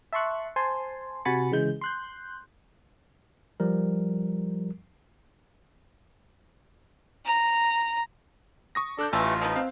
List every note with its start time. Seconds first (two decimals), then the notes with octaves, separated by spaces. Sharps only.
0.13 E5 A5 C6 C#6 F#6
0.56 C5 G#5 A5 C6
1.25 C3 F#4 G#5 B5 A6 C#7
1.52 C#3 E3 G#3 G6
1.81 C6 F#6 G6
3.60 F3 G3 A#4
7.25 A#5
8.75 C#6 D#6 A#6
8.99 D4 A4 F#6 G6
9.13 A1 E3 A3 F4
9.41 F3 B3 D#4
9.56 C4 F5